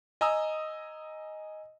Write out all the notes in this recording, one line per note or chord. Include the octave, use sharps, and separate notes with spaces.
D#5 G#5 A#5 D#6 E6